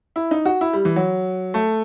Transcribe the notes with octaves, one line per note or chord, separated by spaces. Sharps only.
E4
D#4
F#4
E4
G3
E3
F#3
A3